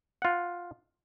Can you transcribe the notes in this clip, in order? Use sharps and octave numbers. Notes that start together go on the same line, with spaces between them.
F4 F#5